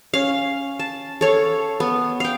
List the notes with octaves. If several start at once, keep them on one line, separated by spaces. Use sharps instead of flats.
C#4 F5
A5
A4 C#5 F5
B3
F5 G5